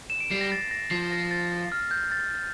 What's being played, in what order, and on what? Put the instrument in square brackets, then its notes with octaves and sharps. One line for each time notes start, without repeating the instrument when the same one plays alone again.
[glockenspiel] E7
D7
[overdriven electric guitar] G3 [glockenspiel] C7
[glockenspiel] A#6
A6
A#6
[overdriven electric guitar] F3 [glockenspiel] C7
[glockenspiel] A#6
A6
F6
G6
A6